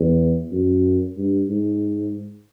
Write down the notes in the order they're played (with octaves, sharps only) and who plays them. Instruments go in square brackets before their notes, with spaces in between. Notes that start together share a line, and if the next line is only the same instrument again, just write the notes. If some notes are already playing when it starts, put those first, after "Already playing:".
Already playing: [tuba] E2
F#2
G2
G#2